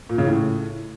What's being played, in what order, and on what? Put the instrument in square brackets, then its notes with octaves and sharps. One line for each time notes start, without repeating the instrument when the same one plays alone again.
[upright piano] A#2
C#3
A2